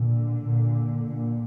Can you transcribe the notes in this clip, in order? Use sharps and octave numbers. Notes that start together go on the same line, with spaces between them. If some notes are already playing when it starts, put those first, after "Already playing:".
Already playing: A#2 D3
A#2
A#2